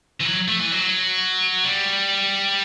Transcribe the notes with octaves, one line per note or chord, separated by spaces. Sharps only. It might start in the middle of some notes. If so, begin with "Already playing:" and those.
E3
F#3
A3
E3
F#3
G3